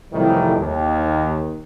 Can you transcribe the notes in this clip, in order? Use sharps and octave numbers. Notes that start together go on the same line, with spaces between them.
C2 F2 A2 D#3 E3 G3
D#2 D#3